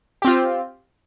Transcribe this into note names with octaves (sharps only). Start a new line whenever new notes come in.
C4 F4 G4